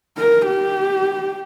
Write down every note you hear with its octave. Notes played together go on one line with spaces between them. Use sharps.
A#4
G4